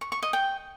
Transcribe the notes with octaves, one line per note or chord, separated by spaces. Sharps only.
C#6
C#6
D#5
G5